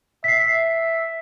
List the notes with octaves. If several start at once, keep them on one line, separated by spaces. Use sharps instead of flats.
E5 B6 C7